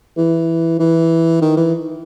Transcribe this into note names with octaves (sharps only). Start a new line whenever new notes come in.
E3
E3
D#3
E3